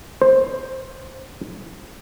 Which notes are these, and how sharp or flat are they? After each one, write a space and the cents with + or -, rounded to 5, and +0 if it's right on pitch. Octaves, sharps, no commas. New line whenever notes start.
C5 +10